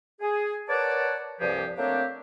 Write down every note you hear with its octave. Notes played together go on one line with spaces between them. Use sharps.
G#4
A#4 B4 C#5 D5 F#5 A5
C2 G2 F3 G4 G#4 D5
A3 A#3 C4 D4 G4 C#5